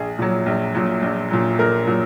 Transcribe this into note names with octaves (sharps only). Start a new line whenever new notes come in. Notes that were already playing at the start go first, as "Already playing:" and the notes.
Already playing: A#1 G#4
A#2 F#3
A#1
A#2 F#3
A#1
A#2 F#3
A#1 A#4
A#2 F#3